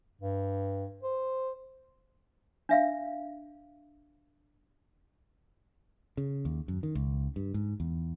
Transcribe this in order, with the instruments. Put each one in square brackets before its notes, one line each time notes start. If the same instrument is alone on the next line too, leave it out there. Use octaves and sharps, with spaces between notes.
[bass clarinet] G2
C5
[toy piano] D4 E5 F5
[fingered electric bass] C#3
D#2
F#2
D#3
C#2
G2
G#2
E2